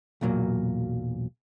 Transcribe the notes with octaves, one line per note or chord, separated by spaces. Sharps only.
B1 E2 A#2 F#3 A#3